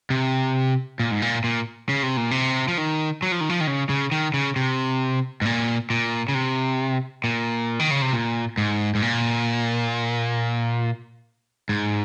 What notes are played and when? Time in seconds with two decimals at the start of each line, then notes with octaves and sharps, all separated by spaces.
0.10 C3
1.00 A#2
1.11 G#2
1.22 A#2
1.44 A#2
1.89 C#3
2.03 C3
2.17 A#2
2.31 C3
2.68 F3
2.78 D#3
3.23 F#3
3.32 F3
3.41 D#3
3.50 F3
3.61 D#3
3.67 C#3
3.89 C#3
4.12 D#3
4.34 C#3
4.56 C3
5.42 G#2
5.45 A#2
5.90 A#2
6.29 C#3
6.35 C3
7.24 A#2
7.80 D#3
7.91 C#3
8.02 C3
8.13 A#2
8.58 G#2
8.95 G#2
9.02 A#2
11.69 G#2